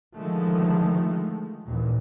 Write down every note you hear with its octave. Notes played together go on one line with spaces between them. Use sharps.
D3 D#3 F3 G#3 A3
A1 D#2 A#2